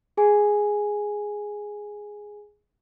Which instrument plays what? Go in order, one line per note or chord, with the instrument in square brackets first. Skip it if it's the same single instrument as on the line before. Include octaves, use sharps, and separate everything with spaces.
[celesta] G#4 G#5